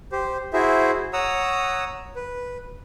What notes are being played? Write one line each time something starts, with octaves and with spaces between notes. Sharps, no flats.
G4 C5
E4 F#4 G#4 C5 E5
C#5 F#5 A#5 D#6 E6
B4